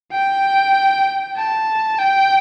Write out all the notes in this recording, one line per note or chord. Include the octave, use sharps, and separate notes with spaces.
G5
A5
G5